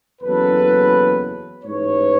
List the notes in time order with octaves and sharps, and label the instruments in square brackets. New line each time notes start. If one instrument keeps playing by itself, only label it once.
[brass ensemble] F#1 E2 C#3 F#3 A4 B4
A1 G#2 E3 B4 C#5